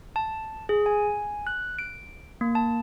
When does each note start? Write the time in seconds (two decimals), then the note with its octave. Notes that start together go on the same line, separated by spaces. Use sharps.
0.16 A5
0.69 G#4
0.86 G#5
1.47 F#6
1.79 D7
2.41 A#3
2.55 A5